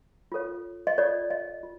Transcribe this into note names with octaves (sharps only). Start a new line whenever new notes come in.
F4 A4 C#5
D#5
F4 A4 C#5 D5
D#5
F4